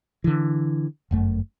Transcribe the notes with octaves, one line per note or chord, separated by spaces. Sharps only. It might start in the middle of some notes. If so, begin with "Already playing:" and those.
D3 E3
G1 F#2 A3